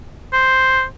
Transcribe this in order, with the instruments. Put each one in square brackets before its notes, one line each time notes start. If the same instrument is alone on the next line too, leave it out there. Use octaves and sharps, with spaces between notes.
[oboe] C5